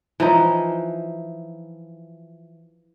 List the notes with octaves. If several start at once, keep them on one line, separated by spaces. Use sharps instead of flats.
E3 F3 D#4